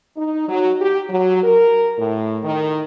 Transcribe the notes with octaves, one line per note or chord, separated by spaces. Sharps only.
D#4
F#3
G4
F#3
A#4
A2
D#3